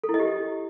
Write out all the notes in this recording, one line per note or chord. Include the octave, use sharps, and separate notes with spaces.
A4
E4
D#5
G4